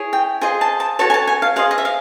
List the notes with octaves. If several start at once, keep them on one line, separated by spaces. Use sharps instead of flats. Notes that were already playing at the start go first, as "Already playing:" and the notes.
Already playing: E4 G#4 C#5
G5
F4 G#4 C5 D#5 G#5
A5
A5
F#4 A4 C#5 A5
G#5
A5
G#5
F5
G#4 C5 D#5 F5
D#5
E5
F5